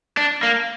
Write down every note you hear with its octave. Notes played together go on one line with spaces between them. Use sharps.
D4
A#3